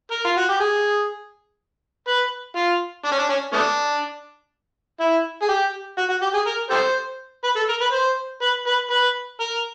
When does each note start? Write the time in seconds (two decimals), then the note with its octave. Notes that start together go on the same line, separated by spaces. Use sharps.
0.11 A#4
0.24 F4
0.37 F#4
0.49 G4
0.60 G#4
2.07 B4
2.56 F4
3.05 D4
3.11 C#4
3.19 D4
3.29 C#4
3.53 A3 B3 D4
5.00 E4
5.42 G#4
5.49 G4
5.98 F#4
6.09 F#4
6.22 G4
6.34 G#4
6.47 A#4
6.71 G4 A4 C5
7.44 B4
7.56 A4
7.69 A#4
7.81 B4
7.93 C5
8.42 B4
8.67 B4
8.91 B4
9.40 A#4